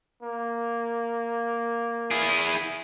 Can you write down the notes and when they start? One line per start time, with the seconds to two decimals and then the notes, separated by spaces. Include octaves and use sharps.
0.23 A#3
2.11 E4 G#4